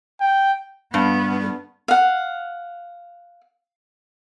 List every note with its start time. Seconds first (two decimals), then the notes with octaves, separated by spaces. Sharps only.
0.20 G5
0.94 G2 B3
1.88 F5 F#5